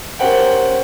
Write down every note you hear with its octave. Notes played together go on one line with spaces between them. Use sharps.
C#4 G4 A#4 C5 F#5 G5